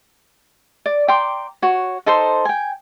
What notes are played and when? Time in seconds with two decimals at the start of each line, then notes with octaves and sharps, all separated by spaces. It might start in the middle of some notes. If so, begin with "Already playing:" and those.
0.86 D5
1.08 G5 A#5 C6 D6
1.62 F#4 C#5
2.06 D#4 A4 C5 C6
2.45 G5 G#5